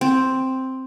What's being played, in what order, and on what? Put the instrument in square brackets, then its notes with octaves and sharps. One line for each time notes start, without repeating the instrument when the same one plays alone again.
[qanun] C4